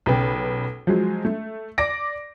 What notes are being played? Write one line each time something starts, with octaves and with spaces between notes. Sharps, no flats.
B1 C#3 B4 G5
F3 F#3 G#3
A3
D5 D6 A#6 D7